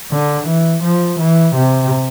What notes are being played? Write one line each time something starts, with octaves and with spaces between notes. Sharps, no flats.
D3
E3
F3
E3
C3